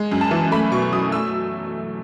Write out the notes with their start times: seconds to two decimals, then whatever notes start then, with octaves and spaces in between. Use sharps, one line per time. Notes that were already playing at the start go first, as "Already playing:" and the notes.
Already playing: G#3
0.12 F#2
0.21 A5
0.31 E3
0.52 A3 B5
0.72 B2 C#6
0.92 F#3 D#6
1.12 A3 E6